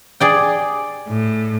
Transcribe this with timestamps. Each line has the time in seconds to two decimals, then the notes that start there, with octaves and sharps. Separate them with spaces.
0.20 G#4 D5 G5
1.09 A2